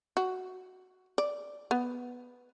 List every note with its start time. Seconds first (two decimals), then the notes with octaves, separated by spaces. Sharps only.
0.17 F#4
1.18 D5
1.71 B3